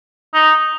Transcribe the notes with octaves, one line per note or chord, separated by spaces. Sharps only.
D#4